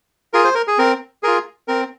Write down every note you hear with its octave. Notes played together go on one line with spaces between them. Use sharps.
F4 G#4 A#4
C5
A#4
G#4
C4 A#4
F4 G#4 A#4
C4 A#4